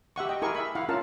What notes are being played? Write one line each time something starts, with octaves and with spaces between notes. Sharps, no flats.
G4 E5 F#5 C#6
D#5 G5
E4 G4 G#4 A#4 G#5 C#6
E5 B5
E4 F5 F#5
C#4 F4 A#4 F5 A5